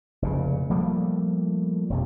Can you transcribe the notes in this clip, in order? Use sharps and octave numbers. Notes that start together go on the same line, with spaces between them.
F1 A#2 C#3
F3 G3 A3 A#3
E1 F2 C3